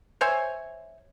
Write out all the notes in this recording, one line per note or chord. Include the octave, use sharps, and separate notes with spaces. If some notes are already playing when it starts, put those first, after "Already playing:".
C5 C#5 E5 G#5